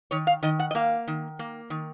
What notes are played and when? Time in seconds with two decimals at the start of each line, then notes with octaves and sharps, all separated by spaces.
0.11 D#3 C#5
0.27 F5
0.43 D#3 D#5
0.59 F#5
0.71 D#5
0.75 A#3 F5
1.08 D#3
1.39 A#3
1.70 D#3